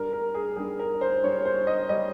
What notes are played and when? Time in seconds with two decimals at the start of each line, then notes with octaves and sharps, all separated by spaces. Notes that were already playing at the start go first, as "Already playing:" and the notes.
Already playing: G2 G3 A#4
0.13 A#4
0.34 G#4
0.56 G2 G3 G#4
0.79 A#4
1.01 C5
1.24 G2 G3 C#5
1.45 C5
1.67 D#5
1.89 G3 D#5